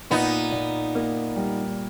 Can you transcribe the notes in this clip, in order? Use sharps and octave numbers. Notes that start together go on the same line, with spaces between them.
A#2 B3 D#4
A#2
A#3
G3